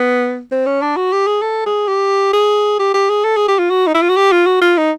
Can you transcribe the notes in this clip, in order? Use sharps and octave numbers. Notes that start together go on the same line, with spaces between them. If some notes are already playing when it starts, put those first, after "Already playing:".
Already playing: B3
C4
C#4
D4
F#4
G4
G#4
A4
G#4
G4
G#4
G4
G4
G#4
A4
G#4
G4
F4
F#4
D#4
E4
F4
F#4
G4
F4
F#4
F4
D#4